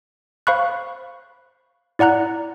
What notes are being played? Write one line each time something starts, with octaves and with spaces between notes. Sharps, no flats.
C5 F5 B5 C#6 F#6
E4 D5 F#5 A#5 F#6